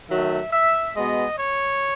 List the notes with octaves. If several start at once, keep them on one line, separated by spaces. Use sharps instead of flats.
D#3 F#3 A3 E5
E5
B2 G#3 B3 D#5
C#5